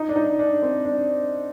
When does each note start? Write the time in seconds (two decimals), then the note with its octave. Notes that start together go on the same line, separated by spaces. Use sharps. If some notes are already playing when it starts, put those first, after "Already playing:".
Already playing: D#4
0.09 D4
0.16 D#4
0.39 D4
0.62 C4
0.85 D4